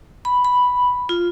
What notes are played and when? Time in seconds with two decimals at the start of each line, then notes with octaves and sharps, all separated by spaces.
0.25 B5
0.45 B5
1.09 F4